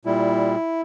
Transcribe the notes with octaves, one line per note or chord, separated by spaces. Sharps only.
A#2 G3 E4